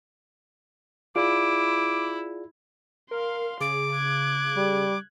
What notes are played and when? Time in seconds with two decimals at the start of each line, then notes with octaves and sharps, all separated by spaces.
1.16 E4 F4 G#4 D5 D6
3.11 A#4 F5 C6
3.61 C#3 G#4 D6
3.94 F#6 G#6
4.56 G3